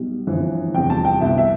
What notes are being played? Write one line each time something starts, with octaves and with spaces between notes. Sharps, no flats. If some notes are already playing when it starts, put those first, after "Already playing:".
Already playing: B1 B2 G3
G1 F2 E3
F1 E2 C3 G3 G5
A5
G5
C2 B2 B3 E5
E5